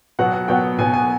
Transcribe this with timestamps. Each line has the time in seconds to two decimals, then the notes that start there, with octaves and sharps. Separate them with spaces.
0.19 B2 F#3 B3 F#5
0.33 F#5
0.48 B2 F#3 B3 G5
0.78 B2 F#3 B3 G#5
0.94 G#5